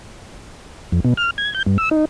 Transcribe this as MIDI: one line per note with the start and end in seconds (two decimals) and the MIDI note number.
0.92 1.00 41
1.04 1.14 47
1.17 1.31 89
1.38 1.54 92
1.55 1.63 91
1.66 1.77 43
1.78 1.89 88
1.91 2.05 63